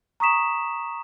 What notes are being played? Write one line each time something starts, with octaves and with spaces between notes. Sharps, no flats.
A#5 C#6 D#6 B6 E7